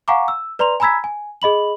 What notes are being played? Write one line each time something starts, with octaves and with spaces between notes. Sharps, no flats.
F5 F#5 G#5 A#5 C#6 D6
E6
B4 D5 A#5 C6 F7
G#5 A#5 B5 E6 G#6 B6
G#5
G#4 D#5 B5 F#7